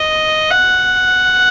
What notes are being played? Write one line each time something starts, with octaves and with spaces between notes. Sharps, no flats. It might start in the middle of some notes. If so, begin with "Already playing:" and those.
Already playing: D#5
F#5